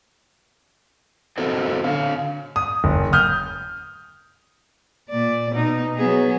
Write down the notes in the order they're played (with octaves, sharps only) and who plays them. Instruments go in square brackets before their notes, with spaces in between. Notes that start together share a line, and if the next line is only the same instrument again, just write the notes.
[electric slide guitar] B3 C4 F#4 A4 C5 D#5
D3 F5
[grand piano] D#6
F#1
D#6 F6 G6
[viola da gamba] A#2 D5
B2 D#4
F#3 B3 G#4